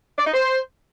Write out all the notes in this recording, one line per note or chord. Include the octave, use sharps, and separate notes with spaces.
D5
D#4
C5